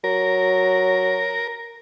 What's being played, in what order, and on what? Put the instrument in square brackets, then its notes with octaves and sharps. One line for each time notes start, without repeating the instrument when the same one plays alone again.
[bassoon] F#3 [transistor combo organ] A#4